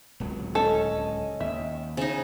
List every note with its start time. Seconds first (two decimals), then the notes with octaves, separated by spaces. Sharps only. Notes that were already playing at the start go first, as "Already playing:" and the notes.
0.20 D1 C#2 F#3
0.55 C#4 A4 D#5
1.40 D#2 E5
1.97 C#3 D#4 C5